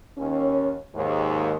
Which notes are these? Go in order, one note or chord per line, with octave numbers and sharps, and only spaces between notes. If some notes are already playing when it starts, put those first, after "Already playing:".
D#2 C#4
D#2 G#2